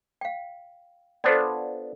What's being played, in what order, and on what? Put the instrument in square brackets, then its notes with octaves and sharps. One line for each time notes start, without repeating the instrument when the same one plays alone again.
[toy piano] F5 G5
[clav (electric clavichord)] B3 D4 F4 [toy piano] A4 C5 D5